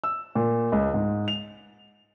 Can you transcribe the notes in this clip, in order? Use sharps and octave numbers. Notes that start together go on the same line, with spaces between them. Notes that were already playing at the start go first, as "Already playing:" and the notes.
E6
A#2
C#2
G#2
F7